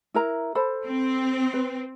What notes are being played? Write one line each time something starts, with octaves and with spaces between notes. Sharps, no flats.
E4 A#4 A#5
A4 C5 B5
C4
B4